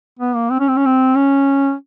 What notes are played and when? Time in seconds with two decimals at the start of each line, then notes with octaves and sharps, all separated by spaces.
0.19 B3
0.35 A#3
0.51 C4
0.60 C#4
0.68 C4
0.77 C#4
0.86 C4
1.16 C#4